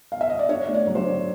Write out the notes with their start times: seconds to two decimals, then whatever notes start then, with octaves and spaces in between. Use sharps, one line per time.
0.12 F5
0.21 E5
0.30 D#5
0.39 D5
0.49 D4 C#5
0.68 A3
0.74 D5
0.87 F#3
0.95 C5
0.99 C#5
1.06 D4